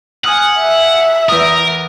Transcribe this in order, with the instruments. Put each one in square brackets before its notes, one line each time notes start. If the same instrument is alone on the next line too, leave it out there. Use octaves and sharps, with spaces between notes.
[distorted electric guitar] F#5 [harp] G#5 D#6 F6
[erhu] E5
[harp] E2 D#6 [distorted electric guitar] A#4